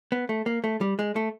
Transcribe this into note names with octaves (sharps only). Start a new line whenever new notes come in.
B3
A3
A#3
A3
G3
G#3
A3